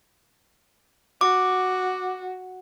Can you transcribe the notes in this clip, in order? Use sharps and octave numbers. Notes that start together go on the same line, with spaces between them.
F#4 D6